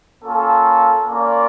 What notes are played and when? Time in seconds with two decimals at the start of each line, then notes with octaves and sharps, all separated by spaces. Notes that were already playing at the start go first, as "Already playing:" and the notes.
0.24 A#3 C#4 F4 A4
1.08 A#3 C#4 F4 A#4 D5